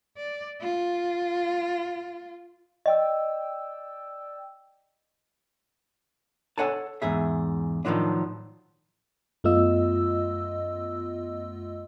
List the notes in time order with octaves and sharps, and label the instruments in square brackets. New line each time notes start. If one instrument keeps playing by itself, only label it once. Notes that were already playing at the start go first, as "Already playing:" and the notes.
[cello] D5
F4
[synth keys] D5 G5 E6 [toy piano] D#5
[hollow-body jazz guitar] A4 C5 C#5 F#5 G#5 A5
E2 G#2 G#4 E5
A2 D#3 F3 F#3 D4
[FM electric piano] F#2 A3 B3 F4 D#5 E6